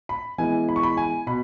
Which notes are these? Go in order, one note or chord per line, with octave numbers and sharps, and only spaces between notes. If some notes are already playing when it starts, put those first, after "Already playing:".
B5
E3 G#3 B3 E4 G#5
B5
C#6
B5
G#5
B2 B5